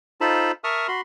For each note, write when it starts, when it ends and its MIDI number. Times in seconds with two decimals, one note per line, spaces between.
0.21 0.52 63
0.21 0.52 65
0.21 0.52 69
0.21 0.52 72
0.21 0.52 81
0.21 0.52 83
0.64 0.87 70
0.64 0.87 76
0.64 0.87 81
0.64 0.87 85
0.64 0.87 87
0.64 0.87 89
0.88 1.01 66
0.88 1.01 83
0.88 1.01 84